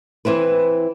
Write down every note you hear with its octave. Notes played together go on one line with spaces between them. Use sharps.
E3 C4 E4 B4